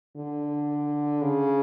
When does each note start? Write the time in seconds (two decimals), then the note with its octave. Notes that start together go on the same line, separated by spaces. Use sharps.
0.16 D3
1.22 C#3